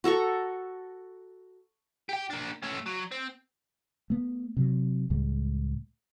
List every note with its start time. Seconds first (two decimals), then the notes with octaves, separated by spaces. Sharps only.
0.04 F#4 A4 A#5 C#6
2.09 G4 G5
2.30 A#3 D4
2.63 A3 C#4
2.86 F#3
3.12 C4
4.10 A3 B3
4.57 C3 F#3
5.10 C#2 A2 G3 G#3